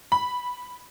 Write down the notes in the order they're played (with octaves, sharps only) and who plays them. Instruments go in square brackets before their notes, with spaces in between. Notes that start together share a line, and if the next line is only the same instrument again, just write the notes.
[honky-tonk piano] B5